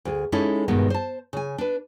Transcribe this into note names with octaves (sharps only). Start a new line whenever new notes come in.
D2 G#4
G#3 C#4 D#4 E4 G#4 A4
G2 B2 D#3 G#3 B3
C5 A5
C#3 G#5
D4 B4